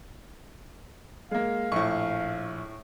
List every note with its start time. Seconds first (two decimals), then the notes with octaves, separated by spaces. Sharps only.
1.31 G#3 A#3 F5
1.72 A#1 A2 C#6